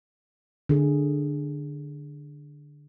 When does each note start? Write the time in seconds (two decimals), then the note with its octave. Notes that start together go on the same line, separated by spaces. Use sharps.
0.69 D3 G#4